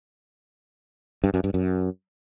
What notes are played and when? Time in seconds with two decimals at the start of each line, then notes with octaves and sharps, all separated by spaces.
1.24 G2
1.34 F#2
1.44 G2
1.54 F#2